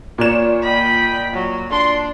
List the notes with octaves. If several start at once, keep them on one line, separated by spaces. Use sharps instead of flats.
A#2 C#5 D5 E7
D#5 G5 B5
F#3
D4 C6